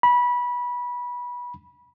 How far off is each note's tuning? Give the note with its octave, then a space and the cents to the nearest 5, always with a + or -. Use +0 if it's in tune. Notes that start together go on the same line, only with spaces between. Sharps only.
B5 -20